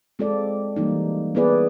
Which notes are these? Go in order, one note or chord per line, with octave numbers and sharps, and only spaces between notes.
G#3 C4 F4 A4 D5
E3 G3 A#3 D#4
B3 E4 G#4 B4 D5